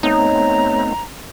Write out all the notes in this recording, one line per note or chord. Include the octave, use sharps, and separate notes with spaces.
A3 B3 C4 D#4 C#5 A#5